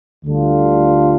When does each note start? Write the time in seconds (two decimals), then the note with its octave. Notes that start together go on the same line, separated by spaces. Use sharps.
0.24 D2 D3 G3 D4 F4